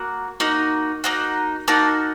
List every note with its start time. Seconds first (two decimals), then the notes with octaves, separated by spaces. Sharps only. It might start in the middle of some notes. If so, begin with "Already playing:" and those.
Already playing: A#3 F#4
0.40 A#3 D#4 F#4
1.04 A#3 D#4 F#4
1.68 A#3 D#4 F#4 A5